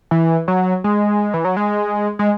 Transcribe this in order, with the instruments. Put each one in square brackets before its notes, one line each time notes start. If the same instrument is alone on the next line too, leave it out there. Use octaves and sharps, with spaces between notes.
[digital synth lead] E3
F#3
G#3
E3
F#3
G#3
G#3